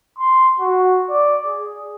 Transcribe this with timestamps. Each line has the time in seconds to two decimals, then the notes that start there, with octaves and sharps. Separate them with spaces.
0.19 C6
0.60 F#4
1.10 D5
1.46 G#4